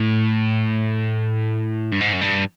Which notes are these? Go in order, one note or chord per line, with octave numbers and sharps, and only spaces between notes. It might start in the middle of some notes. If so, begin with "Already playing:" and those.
Already playing: A2
G2
G#2
F#2
G2